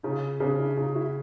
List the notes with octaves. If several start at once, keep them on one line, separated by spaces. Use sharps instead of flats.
C#3 D#4 F4
C#3 C4 D4
D4 E4
C#3 D#4 F4
E4 F#4